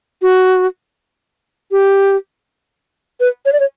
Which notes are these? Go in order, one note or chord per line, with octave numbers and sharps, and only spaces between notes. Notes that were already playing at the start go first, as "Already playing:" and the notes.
F#4
G4
B4
C#5
D5
C#5